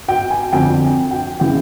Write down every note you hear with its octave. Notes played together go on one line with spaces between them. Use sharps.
G5
G#5
F2 D3 G5
G5
C#3 E3 G5